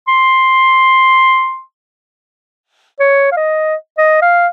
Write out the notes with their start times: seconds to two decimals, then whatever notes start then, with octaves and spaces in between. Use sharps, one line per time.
0.08 C6
3.00 C#5
3.32 F5
3.37 D#5
3.98 D#5
4.22 F5